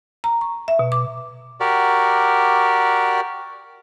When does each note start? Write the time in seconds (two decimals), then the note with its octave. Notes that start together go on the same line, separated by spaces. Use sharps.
0.24 A#5
0.41 C#6
0.68 E5
0.79 B2
0.92 D6
1.60 F#4 G4 A#4 D5